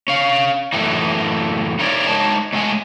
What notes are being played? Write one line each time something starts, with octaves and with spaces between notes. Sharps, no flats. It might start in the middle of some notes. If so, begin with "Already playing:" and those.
C#4 F5
F#2 A2 E3 D#4
D#4 E4 A#4 C#5 D5
G#3 D#4 C#5 D#5 A5
A2 G#3 A3 C#4 G5 G#5